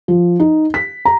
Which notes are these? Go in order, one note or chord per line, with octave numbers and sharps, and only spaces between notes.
F3
D#4
B6
A#5